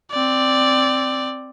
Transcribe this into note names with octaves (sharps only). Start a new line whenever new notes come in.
C4 D5